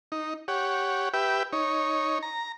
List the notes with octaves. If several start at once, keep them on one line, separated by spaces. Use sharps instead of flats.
D#4
G4 C#5 F#5
G4 B4 E5 G5
D#4 C#5
A#5